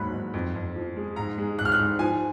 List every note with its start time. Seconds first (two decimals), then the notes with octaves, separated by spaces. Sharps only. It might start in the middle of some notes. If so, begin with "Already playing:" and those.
Already playing: D#2 G#2 F#3 A#3 B5 F#6
0.13 G#2
0.34 F2
0.55 F2
0.76 F3
0.96 G#3
1.16 G#2 A#5
1.38 G#3
1.58 G#2 F#6
1.65 F6
1.72 F#6
1.79 G#2
1.99 F3 G#5